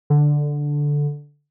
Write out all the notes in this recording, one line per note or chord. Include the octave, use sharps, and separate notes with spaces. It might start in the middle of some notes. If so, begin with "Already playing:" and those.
D3